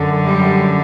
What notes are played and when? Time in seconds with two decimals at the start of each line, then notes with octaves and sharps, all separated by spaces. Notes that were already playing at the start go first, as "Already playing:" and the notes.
Already playing: F#2 D3
0.26 G3